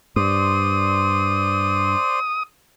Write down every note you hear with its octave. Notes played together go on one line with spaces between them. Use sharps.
G2 C5 D5 C6 D#6